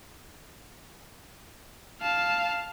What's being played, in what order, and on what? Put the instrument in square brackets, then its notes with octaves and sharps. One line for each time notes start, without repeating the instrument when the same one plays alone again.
[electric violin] F5 A5